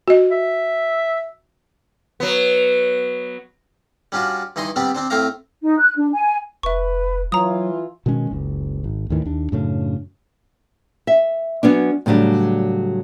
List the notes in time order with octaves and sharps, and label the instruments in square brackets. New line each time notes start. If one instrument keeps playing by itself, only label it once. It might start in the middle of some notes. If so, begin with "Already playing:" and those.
[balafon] F#4 D#5
[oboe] E5
[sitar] F#3 B3
[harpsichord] G3 C#4 D4 F4 F#4
G2 E3 D#4 D#5 C6
G3 B3 C4 D4 G4
C4 D4 C5
A2 A3 C4 C5 F5 A#5
[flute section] D#4
F#6
D4
G#5
[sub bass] F1 [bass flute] B4 [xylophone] E5 C#6
[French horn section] E3 F4 [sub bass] F#3 [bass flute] C#5 [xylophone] A#5 D#6
[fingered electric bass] B2 D#3 G#3 C#4
F#1 C#2
G#1
D#2 A2 D#3 E3
D#2 D4
F#2 A2 C#3 D4
[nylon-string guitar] E5
F#3 B3 C#4 D4
A2 C#3 F#3 G3 D4